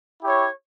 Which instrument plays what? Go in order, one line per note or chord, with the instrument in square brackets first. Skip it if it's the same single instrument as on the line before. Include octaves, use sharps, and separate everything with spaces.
[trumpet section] E4 G4 C#5